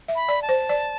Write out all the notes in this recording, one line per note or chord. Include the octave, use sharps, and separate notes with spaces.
E5
B5
D5
A5
C5
D5